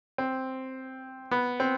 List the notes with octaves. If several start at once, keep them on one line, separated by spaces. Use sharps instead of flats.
C4
B3
C4